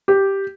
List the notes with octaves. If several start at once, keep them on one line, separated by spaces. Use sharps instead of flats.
G4